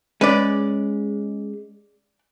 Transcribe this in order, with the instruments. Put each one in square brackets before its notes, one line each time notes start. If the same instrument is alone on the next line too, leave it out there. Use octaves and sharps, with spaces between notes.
[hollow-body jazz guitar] G#3 C#4 [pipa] B4 D5